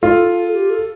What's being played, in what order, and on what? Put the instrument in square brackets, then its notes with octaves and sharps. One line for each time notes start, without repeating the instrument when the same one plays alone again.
[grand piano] F4 [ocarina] A4
[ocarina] G4
A4